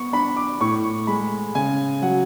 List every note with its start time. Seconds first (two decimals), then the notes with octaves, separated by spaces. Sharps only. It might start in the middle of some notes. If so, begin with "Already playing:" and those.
Already playing: B3 C#6
0.13 D4 B5
0.37 D6
0.60 A2 C#6
1.07 G#3 B5
1.55 C#3 G#5
2.02 F#3 F#5